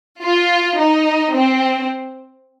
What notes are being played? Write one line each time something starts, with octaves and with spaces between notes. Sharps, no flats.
F4
D#4
C4